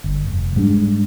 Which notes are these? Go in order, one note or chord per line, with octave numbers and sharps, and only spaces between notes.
G1
F1
G#2 G3 G#3 D4